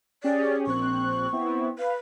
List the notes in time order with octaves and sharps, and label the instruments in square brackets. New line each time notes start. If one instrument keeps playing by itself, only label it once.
[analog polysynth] C#4 G4 G#4 [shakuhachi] D5
[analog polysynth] A#1 C4 F#6 [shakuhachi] C#6
[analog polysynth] B3 C4 E4
[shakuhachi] B4 [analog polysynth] F5